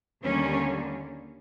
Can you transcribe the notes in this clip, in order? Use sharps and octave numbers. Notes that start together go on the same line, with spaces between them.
D#2 D3 G3 A#3 C#4